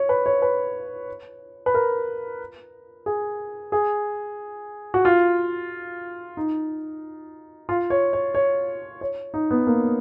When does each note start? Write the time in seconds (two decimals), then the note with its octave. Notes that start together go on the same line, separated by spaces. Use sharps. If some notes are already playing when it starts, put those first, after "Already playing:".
Already playing: C#5
0.09 B4
0.26 C#5
0.42 B4
1.66 B4
1.74 A#4
3.06 G#4
3.72 G#4
4.94 F#4
5.05 F4
6.37 D#4
7.69 F4
7.90 C#5
8.13 C#5
8.35 C#5
9.01 C#5
9.34 D#4
9.51 B3
9.67 A#3